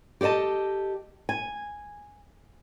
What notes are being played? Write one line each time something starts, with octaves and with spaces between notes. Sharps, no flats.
G4 A4 D5 D#5 A5
G#5